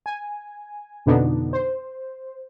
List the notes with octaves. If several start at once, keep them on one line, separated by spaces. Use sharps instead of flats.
G#5
F2 B2 D3 B3 D4 D#4
C5